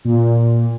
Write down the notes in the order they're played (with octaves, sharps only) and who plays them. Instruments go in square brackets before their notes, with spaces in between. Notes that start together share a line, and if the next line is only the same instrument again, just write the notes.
[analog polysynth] A#2